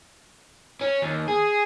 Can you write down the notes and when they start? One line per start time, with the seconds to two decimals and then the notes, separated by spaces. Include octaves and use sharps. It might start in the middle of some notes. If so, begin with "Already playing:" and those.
0.81 C#4
1.02 D#2
1.28 G#4